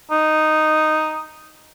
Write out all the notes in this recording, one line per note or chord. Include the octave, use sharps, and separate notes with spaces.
D#4